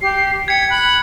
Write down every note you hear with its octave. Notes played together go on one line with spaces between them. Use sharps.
G4 C7
G5 G#6 B6 C#7
B5 F#6